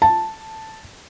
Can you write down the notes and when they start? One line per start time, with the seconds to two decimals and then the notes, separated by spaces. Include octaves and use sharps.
0.02 A5